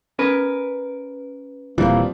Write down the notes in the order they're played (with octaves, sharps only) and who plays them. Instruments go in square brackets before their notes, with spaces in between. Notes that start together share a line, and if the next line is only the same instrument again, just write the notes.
[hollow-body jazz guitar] C#4 A#4 B4
[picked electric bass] D#1 E3 [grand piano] F3 G3 C4 [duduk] A#3